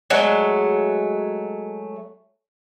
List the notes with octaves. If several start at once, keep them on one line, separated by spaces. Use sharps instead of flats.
F#3 G#3 A3